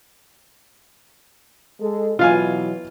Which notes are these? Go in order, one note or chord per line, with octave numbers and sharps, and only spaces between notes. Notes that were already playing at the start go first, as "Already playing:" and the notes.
G#3 G#4 A4
B2 E3 F#3 F4 F5 G#5